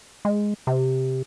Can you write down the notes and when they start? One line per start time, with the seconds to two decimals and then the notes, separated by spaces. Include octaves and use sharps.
0.25 G#3
0.67 C3